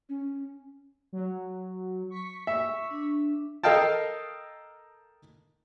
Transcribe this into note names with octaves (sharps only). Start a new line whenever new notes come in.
C#4
F#3
C#6 B6
E5
D4
A4 A#4 D#5 F5 G5 A5